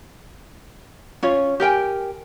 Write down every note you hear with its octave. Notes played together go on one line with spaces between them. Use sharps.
C#4 F4 C#5
G4 A#4 G5 G#5